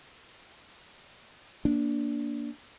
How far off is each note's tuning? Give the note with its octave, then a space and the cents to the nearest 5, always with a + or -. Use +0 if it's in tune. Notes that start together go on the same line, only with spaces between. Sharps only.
A#3 +10 D4 -15